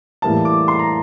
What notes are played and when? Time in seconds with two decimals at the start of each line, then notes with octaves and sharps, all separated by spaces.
0.22 A2 E3 G3 A#3 E4 A5
0.45 D6
0.68 C6
0.79 A#5